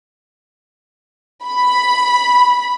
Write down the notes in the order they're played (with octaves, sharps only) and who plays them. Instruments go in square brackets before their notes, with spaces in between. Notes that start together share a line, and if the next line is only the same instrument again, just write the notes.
[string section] B5